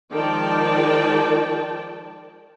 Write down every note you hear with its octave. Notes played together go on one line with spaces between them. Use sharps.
D#3 F3 G#3 D5 G5 A5